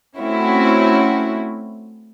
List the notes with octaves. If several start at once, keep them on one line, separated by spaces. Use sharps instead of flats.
A3 C4 C#4 E4 F#4